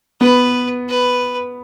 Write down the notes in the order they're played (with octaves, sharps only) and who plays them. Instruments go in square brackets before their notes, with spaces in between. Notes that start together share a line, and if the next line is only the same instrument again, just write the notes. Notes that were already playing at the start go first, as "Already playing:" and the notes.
[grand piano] B3 [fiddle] B4
[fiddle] B4